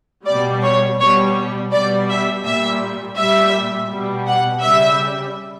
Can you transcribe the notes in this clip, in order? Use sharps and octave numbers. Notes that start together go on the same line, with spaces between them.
B2 G3 D5
C#5
B2 G3 C#5
B2 G3 D5
E5
A#2 G3 E5
A#2 G3 E5
B2 G3
F#5
C#3 G3 E5